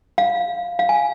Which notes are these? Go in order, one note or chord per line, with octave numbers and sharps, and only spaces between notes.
F5
F5
G#5